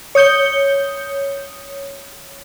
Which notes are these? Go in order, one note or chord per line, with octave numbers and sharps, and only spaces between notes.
C#5 D#6 G6 C#7 G7